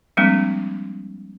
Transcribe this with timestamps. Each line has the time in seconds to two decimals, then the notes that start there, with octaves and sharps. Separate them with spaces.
0.17 F3 G3 G#3 A#3 C4 D4